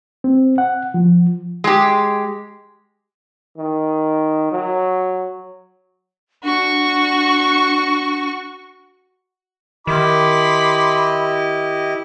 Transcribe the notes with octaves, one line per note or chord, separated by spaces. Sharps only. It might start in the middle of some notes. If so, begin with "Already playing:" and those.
C4
F#5
F3
G#3 G4
D#3
F#3
D4 F#4 C#6
D#3 E4 G4 D#5 B5 C6 D6